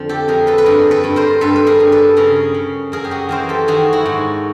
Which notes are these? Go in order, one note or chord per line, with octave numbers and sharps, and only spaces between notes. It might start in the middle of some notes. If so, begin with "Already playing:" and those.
Already playing: F2 D3 F3 C5
G4 A4
F2 G#4 A#4
A4 B4
B4
G2 G#4 A#4
A4 B4
G2
A#4 C5
G2 A4 B4
B4
G#4 A#4
G2
A4 B4
C#3 G#4 A#4
C#3
F#2 G#4 A#4
G4
F#4 G#4
E3 A#4 C5
G4 A4
D#3 F#4 G#4
E4 F#4
G#2